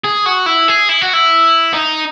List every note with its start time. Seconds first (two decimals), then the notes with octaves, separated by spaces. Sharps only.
0.04 G#4
0.26 F#4
0.46 E4
0.68 G#4
0.89 E4
1.01 F#4
1.13 E4
1.74 D#4